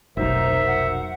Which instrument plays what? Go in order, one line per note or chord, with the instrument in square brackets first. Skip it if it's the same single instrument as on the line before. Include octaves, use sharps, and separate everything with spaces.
[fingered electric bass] F1 B1 [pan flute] D#4 [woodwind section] F#4 A#4 C5 [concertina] E5
[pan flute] F#5